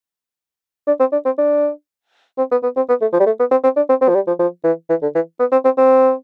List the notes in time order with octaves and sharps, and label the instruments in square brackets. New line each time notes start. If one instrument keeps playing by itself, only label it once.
[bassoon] D4
C4
D4
C4
D4
C4
B3
B3
C4
B3
A3
F3
G3
A3
B3
C4
C4
D4
C4
C4
F3
G3
F3
F3
E3
E3
D3
E3
B3
C4
C4
C4